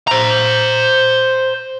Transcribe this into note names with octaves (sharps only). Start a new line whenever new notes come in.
C5 A#5